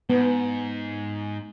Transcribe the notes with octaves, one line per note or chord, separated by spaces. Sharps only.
G#2 B3